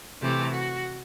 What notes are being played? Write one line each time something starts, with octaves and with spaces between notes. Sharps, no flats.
C3 E3 A3 G4
F#4